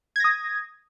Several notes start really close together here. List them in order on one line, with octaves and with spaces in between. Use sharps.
G#6 A#6 D#6